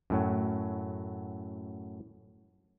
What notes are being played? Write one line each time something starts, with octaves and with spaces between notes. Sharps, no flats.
F#2 A2 F#3